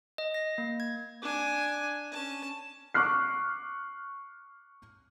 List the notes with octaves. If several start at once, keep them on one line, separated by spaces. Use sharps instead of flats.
D#5
A#6
A#3
G#6
D4 G#5
C#4 A5
C#6 D6 F6 F#6 C7